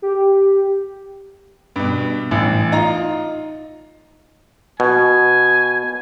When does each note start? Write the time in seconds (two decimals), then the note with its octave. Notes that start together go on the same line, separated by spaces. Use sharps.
0.02 G4
1.76 G2 B2
2.31 A1 E3
2.72 D#4 F4 A#5
4.80 B2 G#5